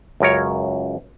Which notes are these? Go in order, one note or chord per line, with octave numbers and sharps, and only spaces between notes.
C#2 F#2 A#4 C#5